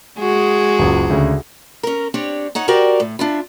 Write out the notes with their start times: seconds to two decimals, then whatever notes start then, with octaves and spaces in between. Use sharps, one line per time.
0.19 G#3 F#4 G#4
0.79 F#1 C#2
1.10 D2 C#3
1.83 C#4 A#4
2.14 C4 D4 G4 C#5
2.55 D#4 C#5 F#5
2.68 F#4 G4 A#4 C5 D5 G5
3.00 A2
3.19 D4 E4 F4